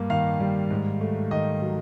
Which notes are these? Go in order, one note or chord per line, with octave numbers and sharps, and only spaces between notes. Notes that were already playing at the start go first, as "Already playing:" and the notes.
Already playing: G2 A#3
D#3 F5
G3
G#2
A3
D#3 D#5
F#3